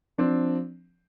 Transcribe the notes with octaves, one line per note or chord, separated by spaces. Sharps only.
F3 C4 D4